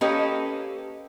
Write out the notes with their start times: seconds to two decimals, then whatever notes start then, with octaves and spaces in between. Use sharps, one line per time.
0.01 A#3 C#4 G4 A4 B4 D#5